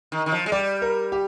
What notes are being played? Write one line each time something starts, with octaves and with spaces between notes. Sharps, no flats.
D#3
D#3
F3
G#3
G3 D5
A#4
G4